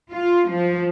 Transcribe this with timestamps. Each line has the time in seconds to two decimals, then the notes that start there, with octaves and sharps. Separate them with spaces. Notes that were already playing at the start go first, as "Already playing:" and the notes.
0.10 F4
0.49 F3